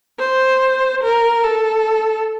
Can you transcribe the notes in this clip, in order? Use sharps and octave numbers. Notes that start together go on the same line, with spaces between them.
C5
A#4
A4